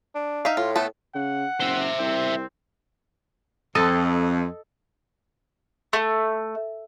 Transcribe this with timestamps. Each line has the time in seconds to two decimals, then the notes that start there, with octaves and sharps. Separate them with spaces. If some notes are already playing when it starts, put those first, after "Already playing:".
0.15 D4
0.45 D#4 E5 F5
0.57 A2 F4
0.76 A3 B3 A4
1.15 C#3 F#5
1.61 F#1 C5 E5
1.99 C2 C4
3.75 F2 A4 D#5
5.93 A3